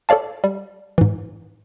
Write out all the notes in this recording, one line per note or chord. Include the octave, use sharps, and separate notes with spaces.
A4 C#5 D5 F5 A5
G3
G#2 E3